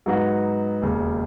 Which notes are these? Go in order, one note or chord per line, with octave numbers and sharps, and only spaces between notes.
G#2 F#3 B3 D#4 F#4
E1 D#2 C#3